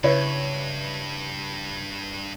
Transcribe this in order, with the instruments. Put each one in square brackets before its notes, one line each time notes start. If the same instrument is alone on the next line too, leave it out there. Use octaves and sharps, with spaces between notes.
[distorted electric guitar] G2 [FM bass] C#3 [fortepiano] E4 B4 C#5